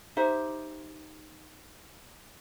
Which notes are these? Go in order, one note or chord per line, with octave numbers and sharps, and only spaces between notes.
D#4 G4 C5 E5